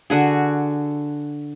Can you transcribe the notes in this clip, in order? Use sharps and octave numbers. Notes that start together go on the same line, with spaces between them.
D3 F#4 G#4